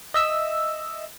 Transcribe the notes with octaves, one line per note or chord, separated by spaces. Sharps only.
D#5 E5 E6